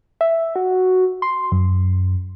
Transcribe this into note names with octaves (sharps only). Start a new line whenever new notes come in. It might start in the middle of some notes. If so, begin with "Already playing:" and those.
E5
F#4
C6
F#2